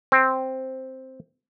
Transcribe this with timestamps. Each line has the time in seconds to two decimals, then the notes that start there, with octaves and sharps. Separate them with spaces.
0.12 C4